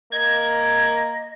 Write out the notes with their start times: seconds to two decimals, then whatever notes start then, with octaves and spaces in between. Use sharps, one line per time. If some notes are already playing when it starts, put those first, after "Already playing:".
0.12 A#3 D#5 G#6